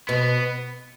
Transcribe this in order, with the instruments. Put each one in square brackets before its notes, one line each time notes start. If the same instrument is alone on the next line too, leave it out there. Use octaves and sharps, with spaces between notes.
[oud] B2 [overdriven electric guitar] B3